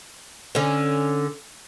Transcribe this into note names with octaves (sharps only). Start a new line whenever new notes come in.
D3 C#4